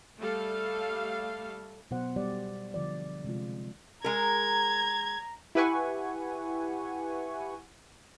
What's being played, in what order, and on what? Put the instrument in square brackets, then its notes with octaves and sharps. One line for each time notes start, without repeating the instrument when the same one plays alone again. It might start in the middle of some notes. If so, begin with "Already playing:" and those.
[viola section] G3 A3 A4 F5
[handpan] B2 F#3 C5 F#5
G3 G4 D5
D3 F3 D5
C3 G#3 F4
[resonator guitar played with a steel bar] G#3 A#4 [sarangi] A#5 [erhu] G#6
[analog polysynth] E4 G4 B4 F#5 G#5 C#6